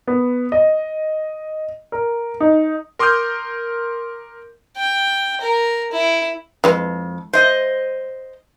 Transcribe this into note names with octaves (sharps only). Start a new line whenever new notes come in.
B3
D#5
A#4
D#4
A#4 C6 D6 D#6 F6 G6
G5
A#4
E4
F2 E3 G#3 B4
C5 D#5